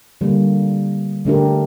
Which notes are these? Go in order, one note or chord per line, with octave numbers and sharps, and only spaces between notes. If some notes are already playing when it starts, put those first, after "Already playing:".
D3 G3 A#3
D3 A3 D4 G4 A#4